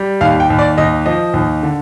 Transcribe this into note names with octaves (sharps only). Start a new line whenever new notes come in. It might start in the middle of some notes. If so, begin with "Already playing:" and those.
Already playing: G3
D#2 F5
G5
D#2
D5
D#2 D#5
F3 D#5
D#2
D3